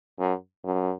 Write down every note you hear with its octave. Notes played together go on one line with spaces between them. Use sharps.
F#2
F#2